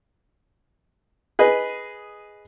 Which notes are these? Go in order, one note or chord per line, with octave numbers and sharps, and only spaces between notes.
G#4 B4 D#5